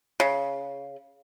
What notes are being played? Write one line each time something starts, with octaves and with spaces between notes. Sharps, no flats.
C#3